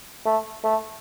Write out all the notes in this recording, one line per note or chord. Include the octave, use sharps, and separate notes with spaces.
A3
A3